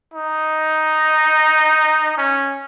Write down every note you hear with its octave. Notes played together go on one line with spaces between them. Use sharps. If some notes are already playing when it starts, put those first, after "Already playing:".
D#4
C#4